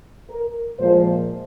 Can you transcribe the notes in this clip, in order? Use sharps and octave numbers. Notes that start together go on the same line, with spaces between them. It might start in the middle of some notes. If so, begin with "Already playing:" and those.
A#4
A#2 F3 G#3 C5